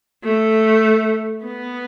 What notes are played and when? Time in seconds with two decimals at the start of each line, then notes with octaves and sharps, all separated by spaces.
0.24 A3
1.45 B3